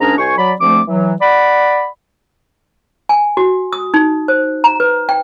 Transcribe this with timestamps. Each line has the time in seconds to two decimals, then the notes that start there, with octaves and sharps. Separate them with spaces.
0.01 G#2 C#4 D4 G#4 A#4 A#5
0.18 C2 C5 G#5 C#6
0.38 F#3 D5 B5
0.61 D2 F3 A3 C4 D6
0.88 E3 F#3
1.21 D5 F#5 B5
3.09 G#5
3.37 F#4
3.73 D#6
3.94 D#4
4.28 C5
4.64 A#5
4.80 B4
5.09 G5